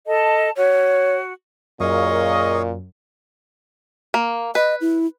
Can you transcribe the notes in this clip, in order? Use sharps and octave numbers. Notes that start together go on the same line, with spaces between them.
A4 D#5 A5
F#4 C#5
F#2 A#2 G#4 A#4 C#5 D#5 F5 C#6
A#3
B4 D#5
E4